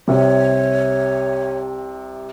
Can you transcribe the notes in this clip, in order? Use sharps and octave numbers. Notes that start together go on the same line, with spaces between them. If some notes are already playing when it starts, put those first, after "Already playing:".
C2 C3 C#5